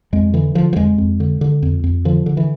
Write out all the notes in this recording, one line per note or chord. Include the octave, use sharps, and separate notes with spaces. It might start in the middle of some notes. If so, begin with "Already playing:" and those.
F2 G#3
D3 E3
D3 F3
F3
F2 G#3
F2
D3
D3
F2
F2
D3 F3
D3
E3